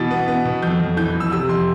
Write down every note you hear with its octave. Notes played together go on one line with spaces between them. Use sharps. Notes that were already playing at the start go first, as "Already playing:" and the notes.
Already playing: B2 E3 A6
B3
B3
B2
F2 G6
F2
E3 G6
F2
E6
C3 E6
F2 C6